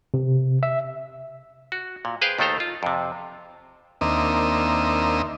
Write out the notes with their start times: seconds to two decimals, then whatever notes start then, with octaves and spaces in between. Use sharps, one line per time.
0.14 C3
0.63 E5
1.72 F#4
2.05 A#2
2.21 G#4 B4 C5 F5 G5
2.38 D#2 D#3 A3 A4 C5 A#5
2.60 F4
2.83 F2 C3
4.01 D#2 A#3 C4 D4 D#5 E5